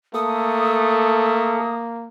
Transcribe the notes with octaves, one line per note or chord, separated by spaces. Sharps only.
A3 A#3 A4 D#6